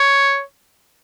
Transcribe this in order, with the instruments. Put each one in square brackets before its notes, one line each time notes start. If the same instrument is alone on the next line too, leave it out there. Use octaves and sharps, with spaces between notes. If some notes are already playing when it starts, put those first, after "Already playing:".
Already playing: [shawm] C#5